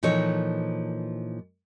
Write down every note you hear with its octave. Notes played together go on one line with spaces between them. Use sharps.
A#2 E3 F3 D#4 A4 C#5